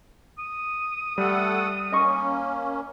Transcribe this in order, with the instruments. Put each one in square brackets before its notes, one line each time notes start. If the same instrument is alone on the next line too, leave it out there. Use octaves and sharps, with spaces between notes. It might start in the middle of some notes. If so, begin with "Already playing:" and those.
[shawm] D#6
[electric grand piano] G3 [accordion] A3 A4 F#5
[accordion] A#3 C#4 [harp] D#5 C#6